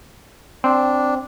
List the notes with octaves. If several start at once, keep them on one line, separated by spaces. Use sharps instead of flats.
C4 D4